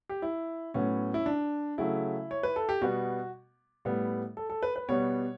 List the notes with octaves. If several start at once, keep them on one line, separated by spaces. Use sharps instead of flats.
G4
E4
A2 F#3 B3 C#4
E4
D4
C#3 F#3 A3 E4
C#5
B4
A4
G4
B2 G3 B3 F#4
A2 G3 B3
A4
A4
B4
B4
B2 G3 B3 C#5